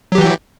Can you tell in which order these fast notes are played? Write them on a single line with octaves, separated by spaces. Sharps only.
F#3 G4 E3